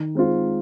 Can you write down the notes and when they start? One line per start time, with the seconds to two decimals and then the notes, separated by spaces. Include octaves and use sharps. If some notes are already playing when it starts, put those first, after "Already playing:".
Already playing: D#3
0.15 G#3 C4 F4